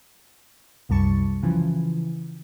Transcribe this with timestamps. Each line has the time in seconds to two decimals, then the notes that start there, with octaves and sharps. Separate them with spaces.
0.89 C2 F#2 G3 A5 C#6
1.43 C#3 E3 F3